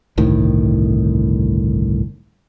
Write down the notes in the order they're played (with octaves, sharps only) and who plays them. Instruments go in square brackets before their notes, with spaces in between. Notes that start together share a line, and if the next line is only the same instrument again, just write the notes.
[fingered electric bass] G1 C2 A2 D#3